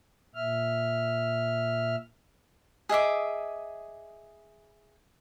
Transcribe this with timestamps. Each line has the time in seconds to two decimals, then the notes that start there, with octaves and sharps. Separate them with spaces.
0.35 A#2 E5 F6
2.89 G#4 D#5 E5 D6